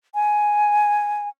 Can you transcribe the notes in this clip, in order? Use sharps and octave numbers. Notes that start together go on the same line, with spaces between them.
G#5